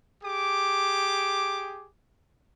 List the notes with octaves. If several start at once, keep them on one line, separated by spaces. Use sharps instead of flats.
G4 G#4 D6